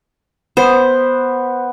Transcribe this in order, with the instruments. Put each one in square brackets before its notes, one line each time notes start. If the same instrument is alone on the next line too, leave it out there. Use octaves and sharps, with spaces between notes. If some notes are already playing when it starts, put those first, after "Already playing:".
[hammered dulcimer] B3 [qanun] C5